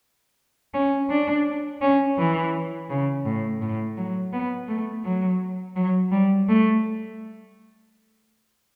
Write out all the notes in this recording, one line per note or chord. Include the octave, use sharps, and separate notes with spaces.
C#4
D4
C#4
E3
C#3
A2
A2
F#3
B3
A3
F#3
F#3
G3
A3